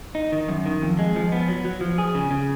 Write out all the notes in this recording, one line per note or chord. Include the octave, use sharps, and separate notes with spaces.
D#4
D#3
F#2
D#3
F2
G#3
F3
B3
F#3
F#3
F3
G#4
C#3
C#3